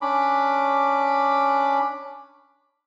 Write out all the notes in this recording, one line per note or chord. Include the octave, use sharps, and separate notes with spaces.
C#4 D4 B5 D6